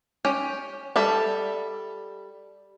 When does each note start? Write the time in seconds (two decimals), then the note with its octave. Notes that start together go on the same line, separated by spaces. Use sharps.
0.25 C#4 G4
0.96 G3 A4 E5